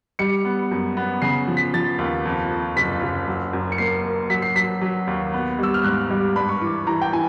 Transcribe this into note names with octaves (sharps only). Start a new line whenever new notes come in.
G3 C#7
B3
F#2
B3
C#3 C7
F3
B6
F3 A6
D#2
F2
F2
F#1 B6
F#1
F#3
F#2
C#7
A#3 C7
A#3
F#3 B6
C7
F#3 B6
F#3
D#2
B3
G3 E6
F6
G#2 F#6
G3
G2 B5
C#6
E3 D6
E3 A#5
G5
E3 G#5